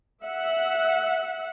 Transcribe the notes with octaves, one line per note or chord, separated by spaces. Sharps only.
E5 F#5